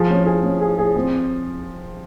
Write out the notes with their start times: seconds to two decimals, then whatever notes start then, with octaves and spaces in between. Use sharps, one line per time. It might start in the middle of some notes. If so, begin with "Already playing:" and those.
Already playing: F3 G#4
0.10 C#4
0.26 G#4
0.43 C#4
0.61 G#4
0.78 G#4
0.96 C4